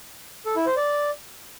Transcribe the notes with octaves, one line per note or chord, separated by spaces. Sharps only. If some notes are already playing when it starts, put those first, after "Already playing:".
A4
E4
C5
D5